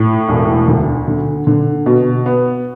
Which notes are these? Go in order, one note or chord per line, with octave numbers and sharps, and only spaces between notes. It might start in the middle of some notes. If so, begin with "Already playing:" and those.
Already playing: A2
E1
D2
D3
D3
B2
B3